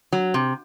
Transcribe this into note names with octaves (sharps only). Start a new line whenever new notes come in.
F#3
C3